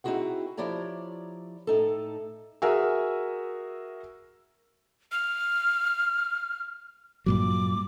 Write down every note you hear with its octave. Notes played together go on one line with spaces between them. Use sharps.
C4 D#4 E4 F#4 G#4 F#5
F3 E4 G4 C#5 D5 A#5
A2 D#4 A4
F#4 G#4 A#4 E5 G#5 E6
F6
G2 A#2 F#3 D6